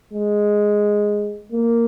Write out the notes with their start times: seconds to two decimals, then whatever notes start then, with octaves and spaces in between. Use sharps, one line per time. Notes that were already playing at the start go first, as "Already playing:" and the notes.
0.13 G#3
1.52 A#3